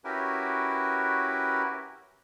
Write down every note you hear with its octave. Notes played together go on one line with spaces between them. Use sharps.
C#4 E4 F#4 G4 A#4 B4